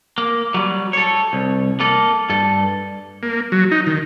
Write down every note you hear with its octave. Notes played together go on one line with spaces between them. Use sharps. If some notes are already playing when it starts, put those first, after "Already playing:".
A#3
F#3 G3
A4 C#5
C2
A#3 A4
G2 A4
A#3
F#3
D#4
D#3